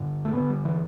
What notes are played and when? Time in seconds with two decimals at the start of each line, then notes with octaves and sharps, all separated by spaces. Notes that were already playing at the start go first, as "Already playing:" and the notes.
Already playing: G2 D3
0.25 A3
0.33 G2 D3 B3
0.50 G3
0.65 E3